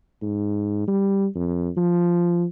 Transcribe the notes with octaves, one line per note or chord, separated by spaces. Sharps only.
G#2
G3
F2
F3